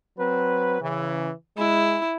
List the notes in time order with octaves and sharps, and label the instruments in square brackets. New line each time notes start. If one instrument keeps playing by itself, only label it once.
[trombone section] F#3 C4 B4
C#3 E3
[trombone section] G#3 [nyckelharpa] E4